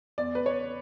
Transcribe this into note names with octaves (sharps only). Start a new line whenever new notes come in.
E2 D5
B4
E2 C#5